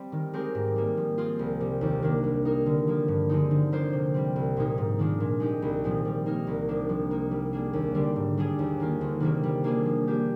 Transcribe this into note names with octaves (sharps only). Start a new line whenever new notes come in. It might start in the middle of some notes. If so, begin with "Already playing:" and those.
Already playing: G3 C4
D#3
G#3 C4 G4 A#4
G#2
G3 A#3
F3
C4 F4 G#4
C2
C3 G3
D#2
D#3 A#3 D4
G3
A#3 D#4 A#4
D3
F3 A#3 F4
G2
D3 G#3 C4 D#4
D3
F3 A#3 F4 C5
C3
G3 C4
C2
A#2 F3 A#3 D#4
G#2
D#3 G#3 D4 F4
A#2
G#3 D#4 G4
C2
A#2 F3 G#3 C4
G3
A#3 D#4 A#4
C2
C3 F3 A#3 D4
F3
A#3 D#4
G3
A#3 D4 G#4
D#2
D3 G3 D4
G#2
G3 D4 G#4
D#2
D#3 A#3 F4
D2
C3 D#3 G3 A#3
G3
A#3 D4 F4 G#4
F3
A#3 D4 G4